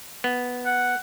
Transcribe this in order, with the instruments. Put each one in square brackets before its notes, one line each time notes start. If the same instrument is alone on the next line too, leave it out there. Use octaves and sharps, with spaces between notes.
[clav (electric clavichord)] B3
[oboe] F#5